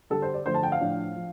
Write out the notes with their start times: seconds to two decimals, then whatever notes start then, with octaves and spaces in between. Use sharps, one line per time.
0.10 D3 G3 D4 A4
0.22 C5
0.34 D5
0.46 D3 F3 A3 C5
0.54 A5
0.63 G5
0.72 F5
0.80 A2 F3 D4
1.16 F3